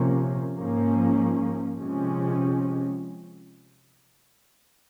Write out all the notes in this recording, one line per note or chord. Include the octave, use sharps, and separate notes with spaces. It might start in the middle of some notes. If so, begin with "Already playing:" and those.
Already playing: C3 F3 A#3 C#4
G#2 F3 A#3 C#4
C3 F3 G#3 C#4